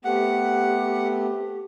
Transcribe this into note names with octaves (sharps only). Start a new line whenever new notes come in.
A3 B3 C4 G4 F#5